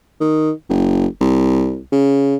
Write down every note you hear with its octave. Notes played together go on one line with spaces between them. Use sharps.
D#3
F#1
C2
C#3